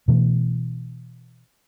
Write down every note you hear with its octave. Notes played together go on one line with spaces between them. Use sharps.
B2 E3 A3